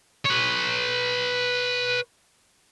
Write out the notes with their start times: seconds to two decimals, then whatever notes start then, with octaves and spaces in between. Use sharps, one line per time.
0.25 B4 C#5